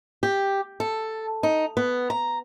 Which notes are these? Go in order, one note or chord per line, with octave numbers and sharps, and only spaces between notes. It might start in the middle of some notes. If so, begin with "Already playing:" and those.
G4
A4
D#4
B3
A#5